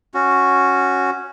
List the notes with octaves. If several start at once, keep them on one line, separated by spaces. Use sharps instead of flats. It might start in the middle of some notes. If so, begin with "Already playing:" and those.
C#4 F#4